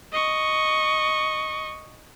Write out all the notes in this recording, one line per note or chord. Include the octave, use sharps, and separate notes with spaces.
D#5 C#6